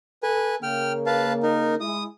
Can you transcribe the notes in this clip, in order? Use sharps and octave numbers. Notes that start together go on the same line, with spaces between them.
A4 B4 G#5
C#3 A#3 G5 F6
B4 F5 A5
D#4 A#4
G#3 E4 D#6